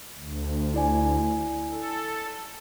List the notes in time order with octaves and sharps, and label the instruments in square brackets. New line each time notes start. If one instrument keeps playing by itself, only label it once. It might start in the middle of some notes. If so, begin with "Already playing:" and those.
[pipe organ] D2
[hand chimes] E4 D5 G#5
[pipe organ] A4